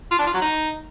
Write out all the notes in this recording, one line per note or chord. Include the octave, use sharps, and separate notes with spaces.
F4
D4
F4
F#3
D#4